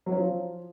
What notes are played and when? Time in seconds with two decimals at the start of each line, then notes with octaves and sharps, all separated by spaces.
0.06 F#3
0.12 C#4
0.18 F3